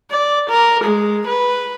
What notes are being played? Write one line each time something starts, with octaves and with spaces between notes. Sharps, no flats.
D5
A#4
G#3
B4